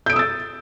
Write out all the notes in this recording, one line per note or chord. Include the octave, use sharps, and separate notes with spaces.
D#6 E6 G6 A6 D7